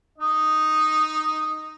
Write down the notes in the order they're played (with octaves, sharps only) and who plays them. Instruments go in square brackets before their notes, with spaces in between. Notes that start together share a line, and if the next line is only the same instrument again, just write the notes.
[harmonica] D#4 D#5